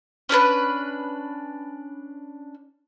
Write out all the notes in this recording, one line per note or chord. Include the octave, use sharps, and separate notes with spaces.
C#4 D4 A#4 B4